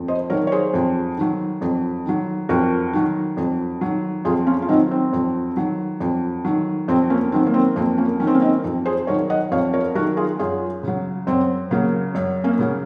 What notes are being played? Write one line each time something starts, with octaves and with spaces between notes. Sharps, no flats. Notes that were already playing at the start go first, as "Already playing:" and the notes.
Already playing: F2
C5 D#5
D#3 F#3 A#4 C#5
C#5
G#4 C5
F2
D#3 F#3
F2
D#3 F#3
F2 F#4 A#4
D#3 F#3
F2
D#3 F#3
F2 F4 G#4
C#4 F4
F4
D#3 F#3 C4 D#4
C4
F2
D#3 F#3
F2
D#3 F#3
F2 C4
A#3 C#4
D#3 F#3 C4
A#3
C4
F2 A#3
A#3 C#4
D#3 F#3 C#4
C4
A#3 C#4
C4 D#4
F2
G#4 C5
D#3 F#3 A#4 C#5
D#5 F#5
F2 C#5 F5
A#4 C#5
D#3 F#3 F#4 A#4
F4 G#4
F#2 F4 G#4
C#3 F#3
F#2 C4
C#3 F#3 A#3
F#2
A#3 C#4
C#3 F#3